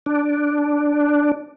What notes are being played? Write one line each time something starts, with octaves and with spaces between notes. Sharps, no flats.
D4